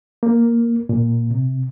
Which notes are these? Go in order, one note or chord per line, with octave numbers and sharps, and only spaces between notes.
A#3
A#2
C3